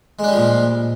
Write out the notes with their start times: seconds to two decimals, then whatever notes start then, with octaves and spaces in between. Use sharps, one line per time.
0.19 G#3
0.23 D4
0.28 G3
0.33 F3
0.37 A#2